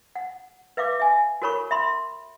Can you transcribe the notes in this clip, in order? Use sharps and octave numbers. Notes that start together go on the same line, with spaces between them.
F#5
B4 E5 F5 D6
E5 G#5
F#4 A4 A#4 C#5 B5 C#6
E5 B5 C6